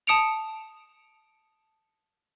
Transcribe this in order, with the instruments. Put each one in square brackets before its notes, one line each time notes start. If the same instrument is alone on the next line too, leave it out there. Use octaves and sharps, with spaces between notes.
[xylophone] A5 D#6 C#7 D7 F7